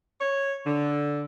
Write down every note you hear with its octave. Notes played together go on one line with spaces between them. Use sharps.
C#5
D3